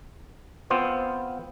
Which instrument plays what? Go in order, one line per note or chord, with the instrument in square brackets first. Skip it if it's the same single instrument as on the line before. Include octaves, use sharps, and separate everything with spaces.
[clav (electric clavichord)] B3 C4 F4 C5